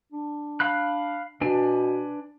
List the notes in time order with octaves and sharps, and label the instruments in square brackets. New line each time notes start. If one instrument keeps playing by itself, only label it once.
[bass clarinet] D4
[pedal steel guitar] F5 B5 F#6
[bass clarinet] B2 [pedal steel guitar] D4 B4 G#5